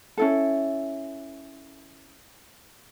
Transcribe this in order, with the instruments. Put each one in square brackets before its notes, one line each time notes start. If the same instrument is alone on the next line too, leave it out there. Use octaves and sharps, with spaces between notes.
[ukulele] C#4 E4 A4